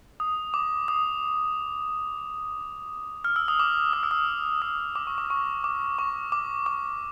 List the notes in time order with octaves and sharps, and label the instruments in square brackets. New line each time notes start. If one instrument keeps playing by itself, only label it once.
[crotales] D#6
D6
D#6
F6
E6
D#6
D6
D#6
E6
D#6
D#6
D6
C#6
D6
C#6
D6
C#6
D6
D6